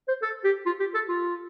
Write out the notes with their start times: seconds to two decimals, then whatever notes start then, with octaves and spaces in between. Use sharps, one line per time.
0.08 C5
0.22 A4
0.44 G4
0.66 F4
0.80 G4
0.95 A4
1.09 F4